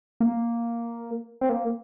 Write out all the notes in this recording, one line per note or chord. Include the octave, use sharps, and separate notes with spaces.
A#3
C4
A#3